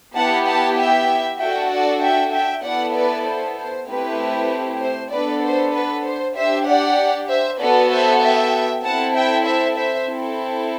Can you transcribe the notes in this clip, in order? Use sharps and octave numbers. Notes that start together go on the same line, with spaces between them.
B3 E4 G4 F#5 A5
F#5 A5
E5 G5
D4 F#4 A4 E5 G5
D5 F#5
E5 G5
E5 G5
B3 E4 A4 D5 F#5
B4 D5
C5
C5
A3 C4 E4 G4 B4
C5
B3 D4 A4 B4 D5
C5
B4
C5
D4 G4 C5 E5
D5 F#5
C5 E5
B3 F#4 A4 B4 D5
C5 E5
E5 G5
C4 E4 A4 F#5 A5
E5 G5
C5 E5
C5 E5
C4 E4 A4